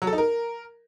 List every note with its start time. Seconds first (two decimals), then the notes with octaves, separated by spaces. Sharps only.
0.02 F#3
0.07 A4
0.13 D#4
0.18 A#4